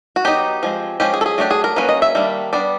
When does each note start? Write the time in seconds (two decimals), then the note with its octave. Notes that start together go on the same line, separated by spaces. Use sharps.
0.16 F#4
0.25 F#3 B3 D#4 G4
0.63 F3 G#3 C4
1.00 F3 G#3 C#4 G4
1.14 G#4
1.21 A4
1.26 G#4
1.38 F#3 A3 D4 G4
1.51 G#4
1.64 A#4
1.76 F#3 A#3 C#4 B4
1.89 D#5
2.02 E5
2.15 D#3 G3 A#3 D4
2.53 G3 B3 D4 D5